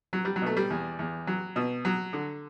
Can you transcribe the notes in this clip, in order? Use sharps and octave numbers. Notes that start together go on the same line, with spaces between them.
F#3
G3
F#3
B2 A3
G3
E2
E2
F#3
B2
F#3
D3